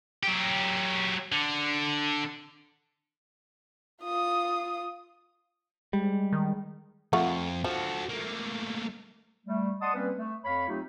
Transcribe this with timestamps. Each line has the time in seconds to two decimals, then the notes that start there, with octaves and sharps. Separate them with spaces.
0.23 F#3 G4
1.32 D3
4.02 F4 D#6
5.93 G3 G#3
6.33 D#3
7.13 F2 A3 F4 F#5
7.64 F3 F#4 A4
8.09 A3 A#3
9.46 G3 A3
9.81 D5 D#5 F#5 A5 C6 D#6
9.94 G3 A#3 C4 C#4 B4
10.17 A3
10.44 F2 C#5 F5 B5
10.68 F#3 A3 C4 D#4 F4 G4